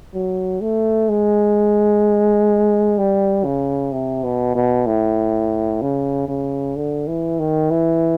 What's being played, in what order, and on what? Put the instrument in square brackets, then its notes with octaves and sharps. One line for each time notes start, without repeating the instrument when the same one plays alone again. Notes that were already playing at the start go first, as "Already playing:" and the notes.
[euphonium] F#3
A3
G#3
G3
C#3
C3
B2
B2
A2
C#3
C#3
D3
E3
D#3
E3